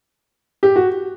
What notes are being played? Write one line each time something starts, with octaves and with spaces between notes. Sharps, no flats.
G4
F#4